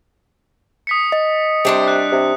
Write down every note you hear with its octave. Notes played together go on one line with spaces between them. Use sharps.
D#6 B6 C#7
D#5
C3 G3 D4 C5
F#6
C3